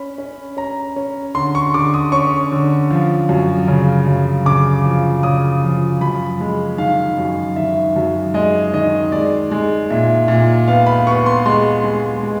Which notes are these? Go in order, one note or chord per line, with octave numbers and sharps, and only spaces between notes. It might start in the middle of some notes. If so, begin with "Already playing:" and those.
Already playing: C#4 B5
C#4
C#4 A#5
C#4
D3 C6
C#6
D3 D6
D#6
C#4 C#6
D3
F3
F#2
C#3
F#2
C#3 D6
F3
C#3 D#6
F3
F#2 B5
G#3
D#3 F5
F#2
D#3 E5
F#2
G#3 D#5
D#3 D#5
G#3 D5
G#3
A#2 E5
A#2
B3 F5
B5
B3 C#6
C6
G#3 C6
G#3
G#3